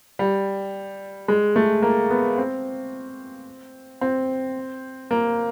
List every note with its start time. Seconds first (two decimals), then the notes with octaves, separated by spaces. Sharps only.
0.19 G3
1.28 G#3
1.56 A3
1.82 A#3
2.10 B3
2.38 C4
4.01 C4
5.11 A#3